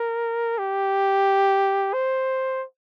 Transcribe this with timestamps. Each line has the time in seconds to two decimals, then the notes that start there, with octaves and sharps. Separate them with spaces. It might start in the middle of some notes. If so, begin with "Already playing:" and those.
Already playing: A#4
0.58 G4
1.94 C5